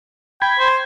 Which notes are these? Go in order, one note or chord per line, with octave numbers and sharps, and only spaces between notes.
G5 B5 G#6
C5